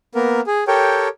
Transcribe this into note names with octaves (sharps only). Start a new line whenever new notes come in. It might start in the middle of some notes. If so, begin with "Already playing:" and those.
A#3 B3 A#4
G#4
G4 A4 A#4 C#5 G5